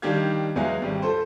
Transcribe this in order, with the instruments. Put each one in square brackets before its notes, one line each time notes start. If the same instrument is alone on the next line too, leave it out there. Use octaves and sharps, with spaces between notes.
[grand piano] D#3 G3 D4 G4 F5 G#6
E2 F#3 G#3 E4 G#4 F5
G#1 G3
F4 A4 C5